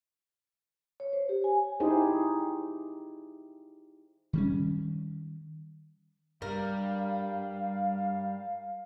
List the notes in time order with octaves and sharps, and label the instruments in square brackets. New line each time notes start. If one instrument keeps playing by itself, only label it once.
[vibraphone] C#5
C5
G4
G#5
[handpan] D#4 E4 G4 G#4 C5
[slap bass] D#3 G3 C#4
[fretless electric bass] G2 [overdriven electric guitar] G3 [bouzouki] A#4 [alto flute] F5